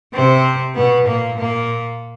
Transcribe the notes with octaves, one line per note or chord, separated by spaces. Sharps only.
C3 C4
B2 B3
A#2 A#3
A#2 A#3